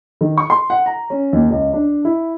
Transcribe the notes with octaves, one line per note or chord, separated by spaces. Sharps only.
D#3
C#6
C6
F#5
A#5
C#4
D#2
C#2
D4
E4